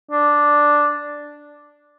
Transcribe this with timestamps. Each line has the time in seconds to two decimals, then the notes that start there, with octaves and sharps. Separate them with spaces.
0.11 D4